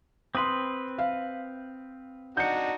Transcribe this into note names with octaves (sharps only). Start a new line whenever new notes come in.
C4 B4 C6 D#6
F5
D4 D#4 F#4 G6 C#7